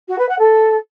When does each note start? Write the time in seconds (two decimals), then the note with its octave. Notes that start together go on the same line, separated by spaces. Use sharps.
0.08 F#4
0.18 B4
0.29 F#5
0.39 A4